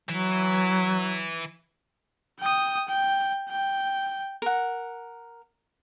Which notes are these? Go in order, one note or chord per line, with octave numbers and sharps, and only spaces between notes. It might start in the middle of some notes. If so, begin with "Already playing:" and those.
E3 F#3 E4
G5 D#6
G5
G5
A#4 F#5